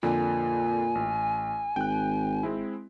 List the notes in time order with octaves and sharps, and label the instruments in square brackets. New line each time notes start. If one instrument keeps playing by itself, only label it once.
[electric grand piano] F2 D3 [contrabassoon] A#2 [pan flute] G#5
[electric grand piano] A1
[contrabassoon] G#1 [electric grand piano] G5 F#6
[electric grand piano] G#3 C4 E4